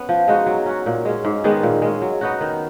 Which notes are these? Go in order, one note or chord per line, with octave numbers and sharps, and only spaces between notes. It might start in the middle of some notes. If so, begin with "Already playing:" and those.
Already playing: B3 C#4
F3
G#3 D#4 F#4
F#3
C#4 F#4
A#2
G#3 C#4
G#2
D#3 G#3 B3
A#2
G#3 C#4
F#3
B3 D#4 F#4
D#3